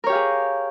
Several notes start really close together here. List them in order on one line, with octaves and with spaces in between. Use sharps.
A#4 C#5 G4 F5 G#4